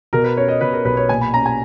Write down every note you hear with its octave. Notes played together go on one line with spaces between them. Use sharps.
B2 A#4
B4
C#4 C#5
D#5
B2 B4
A#4
B1 B4
C#5
A#2 G#5
B5
C#4 A#5
G#5